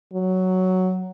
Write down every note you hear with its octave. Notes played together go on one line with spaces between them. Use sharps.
F#3